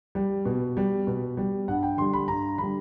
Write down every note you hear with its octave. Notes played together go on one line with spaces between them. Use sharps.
G3
B2
G3
B2
G3
G2 F#5
G5
D3 G3 C6
B5
G2 A#5
D3 G3 B5